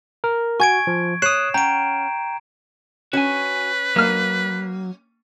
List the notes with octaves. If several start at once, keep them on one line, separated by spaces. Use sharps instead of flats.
A#4
F#4 G#5 C#6 G#6 D7
F3
C#5 D#6 F#6 C7 E7
C#4 F#5 G5 A#5 D7
C#4 F#4 B4 G#5
F#3 A#3 F6